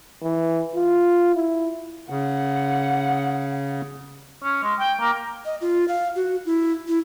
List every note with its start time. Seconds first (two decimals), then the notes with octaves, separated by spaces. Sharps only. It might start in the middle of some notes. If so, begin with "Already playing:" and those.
0.23 E3
0.75 F4
1.34 E4
2.10 C#3 F#5
4.43 C#4
4.63 G#3
4.80 G5
5.00 A#3
5.45 D#5
5.61 F4
5.88 F5
6.16 F#4
6.46 E4
6.88 E4